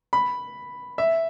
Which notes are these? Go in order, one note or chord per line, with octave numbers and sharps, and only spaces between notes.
B5
E5